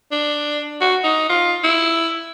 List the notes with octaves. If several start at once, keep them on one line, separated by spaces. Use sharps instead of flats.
D4
F#4
D#4
F4
E4